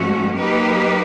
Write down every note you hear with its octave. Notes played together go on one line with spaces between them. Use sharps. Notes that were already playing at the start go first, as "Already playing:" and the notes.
Already playing: G#2 F3 A3 C#4 F#4
F#3 A#3 D#4 G4 B4